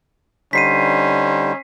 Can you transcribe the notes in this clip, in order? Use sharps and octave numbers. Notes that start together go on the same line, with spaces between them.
D3 G3 C#4 D#4 C5 B6 C7 D#7